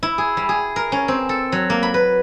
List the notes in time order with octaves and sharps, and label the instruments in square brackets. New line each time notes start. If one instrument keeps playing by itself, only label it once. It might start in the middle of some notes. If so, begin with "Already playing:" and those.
[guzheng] E4
G#4
G3
G#4
A#4
C#4
C4
A4
F#3
A#3
B5
B4